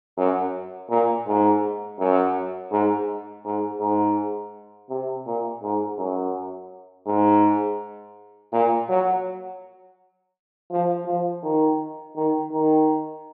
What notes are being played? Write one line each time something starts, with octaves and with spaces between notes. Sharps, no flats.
F#2
A#2
G#2
F#2
G#2
G#2
G#2
C3
A#2
G#2
F#2
G#2
A#2
F#3
F3
F3
D#3
D#3
D#3